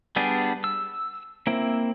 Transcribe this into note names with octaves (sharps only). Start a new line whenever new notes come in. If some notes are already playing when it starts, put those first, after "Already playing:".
G3 B3 D4 G#4
E6
A#3 C4 E4